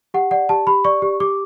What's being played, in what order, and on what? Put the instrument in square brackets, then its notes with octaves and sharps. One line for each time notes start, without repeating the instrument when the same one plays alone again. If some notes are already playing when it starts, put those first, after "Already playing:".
[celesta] G4 F#5
D5 F#5
G4 A5
G4 B5
D5 C#6
G4
G4 D6